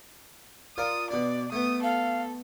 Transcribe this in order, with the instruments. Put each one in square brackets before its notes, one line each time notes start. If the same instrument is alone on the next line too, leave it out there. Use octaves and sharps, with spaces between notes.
[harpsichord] F4 A#4 D5 [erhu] D#6
[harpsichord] B2 D4 [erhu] D5
[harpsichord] A3 B3 [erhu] D#6
[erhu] A4 [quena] F5